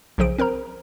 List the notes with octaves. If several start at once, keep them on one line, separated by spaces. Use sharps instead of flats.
B1 C#3 F3 G#4 D7
C4 A#4 C5 A#5